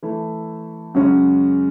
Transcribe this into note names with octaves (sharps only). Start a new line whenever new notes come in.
E3 A3 E4
F#2 C#3 G#3 C#4 F#4